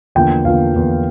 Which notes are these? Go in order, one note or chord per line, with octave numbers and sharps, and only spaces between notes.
E2 D3 F3 A#3 G5
E2 D3 F3 A#3 F5
E2 D3 F3 A#3